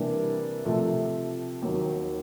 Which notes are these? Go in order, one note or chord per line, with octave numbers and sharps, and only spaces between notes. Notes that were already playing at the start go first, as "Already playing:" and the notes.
Already playing: C3 E3 G3 A#3 D4
C3 F3 A3
D#2 D#3 F#3